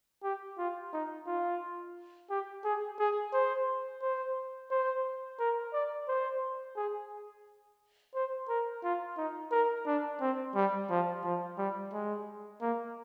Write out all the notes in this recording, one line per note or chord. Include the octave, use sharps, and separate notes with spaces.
G4
F4
D#4
F4
G4
G#4
G#4
C5
C5
C5
A#4
D5
C5
G#4
C5
A#4
F4
D#4
A#4
D4
C4
G3
F3
F3
G3
G#3
A#3